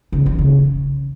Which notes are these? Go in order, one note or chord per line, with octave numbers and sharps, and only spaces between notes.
C#3
D#3
C#3